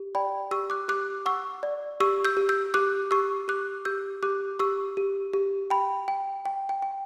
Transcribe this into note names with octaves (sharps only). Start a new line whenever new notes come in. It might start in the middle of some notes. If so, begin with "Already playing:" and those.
Already playing: G4
D5 G5 B5
G4 C#6 E6
D6 F#6
G4 D6 F#6
F#5 C#6 E6
D5
G4 C#6 E6
E6 G6
G4
E6 G6
G4 D6 F#6
G4 C#6 E6
G4 D6 F#6
G4 E6 G6
G4 D6 F#6
G4 C#6 E6
G4
G4
G5 B5
G5
G5
G5
G5